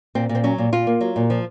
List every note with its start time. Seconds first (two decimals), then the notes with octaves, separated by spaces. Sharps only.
0.15 A#2 C4
0.29 A#2
0.35 C4
0.44 F#3 C#4
0.58 A#2
0.72 A#2 F4
0.87 A#3
1.01 F#3
1.16 A#2
1.30 F3